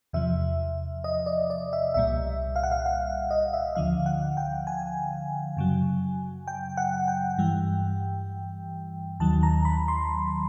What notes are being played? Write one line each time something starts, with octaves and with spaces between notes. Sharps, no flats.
E2 C3 F3 E5
D#5
D5
D5
E5
C2 A#2 G3 E5
F5
F#5
F5
F5
D#5
E5
D2 D3 F3 F5
F#5
G5
G#5
F#2 C#3 F#3
G5
F#5
G5
G2 E3 G3
D#2 D#3 F#3 A5
A#5
B5
C6